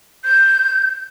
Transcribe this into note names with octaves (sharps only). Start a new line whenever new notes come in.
G6